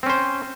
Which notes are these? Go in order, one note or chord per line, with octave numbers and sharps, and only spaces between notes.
C4 C#4 C5